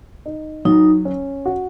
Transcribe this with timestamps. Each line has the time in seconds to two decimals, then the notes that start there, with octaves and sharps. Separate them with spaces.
0.26 D#4
0.65 F#3 D#4
1.05 C#4
1.46 F#4